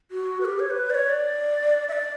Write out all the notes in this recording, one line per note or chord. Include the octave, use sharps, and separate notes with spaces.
F#4
B4
G4
C#5
B4
D5
C#5
D5
E5
D5